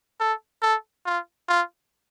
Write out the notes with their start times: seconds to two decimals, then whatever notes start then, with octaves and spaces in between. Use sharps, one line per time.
0.20 A4
0.62 A4
1.06 F4
1.48 F4